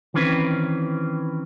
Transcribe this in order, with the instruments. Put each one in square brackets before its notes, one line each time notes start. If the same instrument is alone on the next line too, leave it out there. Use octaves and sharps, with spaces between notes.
[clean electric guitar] D#3 E3 C4 C#4 B4